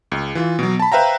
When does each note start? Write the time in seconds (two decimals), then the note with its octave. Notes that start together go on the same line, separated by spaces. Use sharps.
0.12 C#2
0.35 E3 F4
0.59 B2 F#3
0.80 A5 B5
0.92 B4 C5 E5 F5 G5 A#5